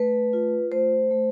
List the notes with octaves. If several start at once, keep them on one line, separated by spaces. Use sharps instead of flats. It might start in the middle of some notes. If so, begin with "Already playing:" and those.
Already playing: A3 B4
F4
A3 C5
A3